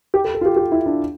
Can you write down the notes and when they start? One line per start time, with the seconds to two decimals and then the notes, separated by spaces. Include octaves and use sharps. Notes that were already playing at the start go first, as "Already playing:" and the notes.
0.14 G4
0.24 A4
0.35 A4
0.41 F4
0.46 G4
0.56 G4
0.72 E4
0.86 D4